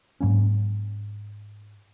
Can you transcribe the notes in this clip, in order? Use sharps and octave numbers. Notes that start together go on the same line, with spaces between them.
G#2 F#3 A#3 C#4